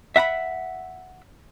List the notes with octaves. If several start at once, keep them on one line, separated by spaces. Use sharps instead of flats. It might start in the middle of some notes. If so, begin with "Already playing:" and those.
E5 F#5 A#5 B5